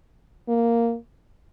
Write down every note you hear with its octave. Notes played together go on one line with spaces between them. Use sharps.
A#3